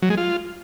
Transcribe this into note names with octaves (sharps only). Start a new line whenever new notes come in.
F#3
G#3
F4